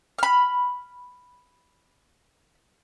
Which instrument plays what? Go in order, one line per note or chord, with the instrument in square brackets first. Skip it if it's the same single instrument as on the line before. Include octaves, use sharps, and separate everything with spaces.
[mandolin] B5 F6